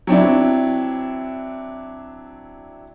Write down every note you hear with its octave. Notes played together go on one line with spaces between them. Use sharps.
F#3 C4 D4 E4